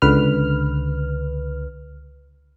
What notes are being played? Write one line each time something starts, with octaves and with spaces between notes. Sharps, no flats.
C#2 D3 B4 F6